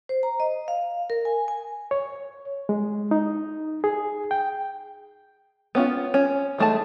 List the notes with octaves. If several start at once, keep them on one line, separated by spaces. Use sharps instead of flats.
C5
A#5
D#5
F5
A#4
G#5
G#5
C#5
G#3
D#4
G#4
G5
B3 C#4 D4 F4
C#4
E3 G#3 A3 D#4 A5